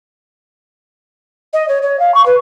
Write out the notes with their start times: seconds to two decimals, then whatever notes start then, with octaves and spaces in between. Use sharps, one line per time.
1.53 D#5
1.68 C#5
1.82 C#5
1.99 F5
2.14 C#6
2.25 B4